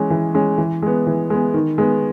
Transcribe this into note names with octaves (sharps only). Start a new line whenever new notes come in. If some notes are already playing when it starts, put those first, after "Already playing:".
Already playing: E3 G#3 C#4
E3
G#3 C#4
E3
G#3 B3
E3
G#3 B3
D#3
G#3 B3